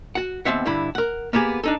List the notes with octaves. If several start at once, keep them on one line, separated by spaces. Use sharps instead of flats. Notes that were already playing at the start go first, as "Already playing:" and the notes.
F#4 F#5
D#2 B2 B3 C4 E5 F#5
G2 D3 E4 B5
A#4 F#5
A#3 B3 G4 G#4
D4 D#4 A4